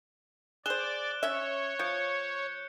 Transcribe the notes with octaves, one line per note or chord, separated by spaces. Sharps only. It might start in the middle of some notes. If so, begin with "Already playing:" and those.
G#4 C5 D5 F#6 E7 G7
C#4 C#5 E5
F3 G6 C#7